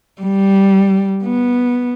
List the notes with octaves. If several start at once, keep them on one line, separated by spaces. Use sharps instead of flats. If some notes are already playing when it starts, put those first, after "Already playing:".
G3
B3